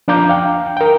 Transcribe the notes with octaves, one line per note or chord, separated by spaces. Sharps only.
F3 D4 F5 A#5 D6 G6
F5 G5
A#4 G5